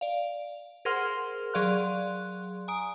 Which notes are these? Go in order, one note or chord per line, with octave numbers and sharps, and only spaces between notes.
D5 F5
G#4 A#4 C5 F#5 C6 F6
F#3 G#4 D5 F5 C6 F#6
G#5 A#5 D#6 D7